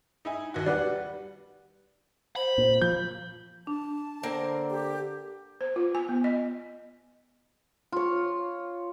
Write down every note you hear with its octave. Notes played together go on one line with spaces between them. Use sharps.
D#4 E4 G#5
D#2 F#4
G3 B4 D5 F#5
C5 B5
A#2
F3 G6
D4 A5
D3 A#3 C4 A#4
G4
C5
F4
G#5
B3
D#5
F4 C#5